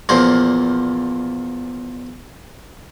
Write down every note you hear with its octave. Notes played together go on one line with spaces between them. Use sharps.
E2 A#2 F3 C5